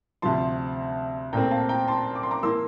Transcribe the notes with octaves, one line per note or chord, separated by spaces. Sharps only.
D2 C3 F3 A5 C6
A#2 A3 C4 G5 A#5
F5 A5
G5 A#5
A5 C6
D6
C6
A#5 D6
E3 A#3 C6 E6